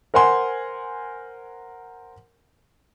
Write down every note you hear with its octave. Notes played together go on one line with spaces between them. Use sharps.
A#4 C5 F#5 G#5 C6